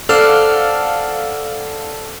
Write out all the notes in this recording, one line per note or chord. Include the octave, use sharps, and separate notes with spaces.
D4 A4 C5 F5 F#5 F6